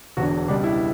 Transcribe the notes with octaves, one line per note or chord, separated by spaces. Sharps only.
E1 E2 D3 F#4
C#2 B2 G3 D4
E4